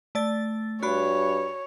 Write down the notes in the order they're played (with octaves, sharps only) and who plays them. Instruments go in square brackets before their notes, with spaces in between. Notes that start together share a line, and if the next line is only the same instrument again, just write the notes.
[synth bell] A3 D5 A6
[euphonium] G2 [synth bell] F#4 D5 B5 [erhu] C#5